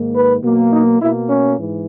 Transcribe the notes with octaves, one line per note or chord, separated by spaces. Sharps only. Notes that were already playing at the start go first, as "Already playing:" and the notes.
Already playing: G#2 D#3 A#3
B4
B2 F#3 A#3
D#4
B2 A#3 E4
C#4
G#2 E3